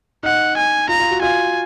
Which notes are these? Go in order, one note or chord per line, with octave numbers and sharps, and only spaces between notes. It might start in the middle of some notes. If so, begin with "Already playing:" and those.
D#4 F#5
G#5
F4 A#5
F4
F#4
F4 G#5